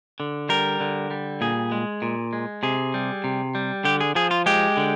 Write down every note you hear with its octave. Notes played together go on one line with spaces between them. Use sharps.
D3
G3 A#4
D3
G3
A#2 G#4
G#3
A#2
G#3
C3 G#4
G3
C3
G3
D3 G4
G#4
F3 G#4
F4
G#3 G4
D3